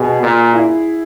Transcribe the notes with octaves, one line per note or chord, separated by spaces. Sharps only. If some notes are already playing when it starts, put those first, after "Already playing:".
Already playing: B2 G#4
A#2
E4